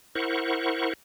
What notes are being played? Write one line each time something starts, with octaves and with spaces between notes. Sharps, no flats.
E4 A#4 C5 F#5 C#6